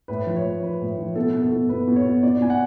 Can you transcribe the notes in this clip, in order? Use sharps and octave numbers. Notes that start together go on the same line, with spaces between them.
A2 B4
F3
C#5
A2
F3 B4
A2
F3
B2 A4
B2
A4
B2
B2 B4
B2
C#5
B2
B2 D5
B2 G#5
F#5